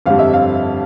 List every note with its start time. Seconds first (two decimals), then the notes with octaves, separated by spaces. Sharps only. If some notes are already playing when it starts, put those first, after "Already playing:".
0.06 G1 F2 D3 G3 F5
0.19 E5
0.33 F5